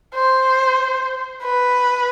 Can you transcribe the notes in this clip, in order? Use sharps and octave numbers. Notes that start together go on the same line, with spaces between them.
C5
B4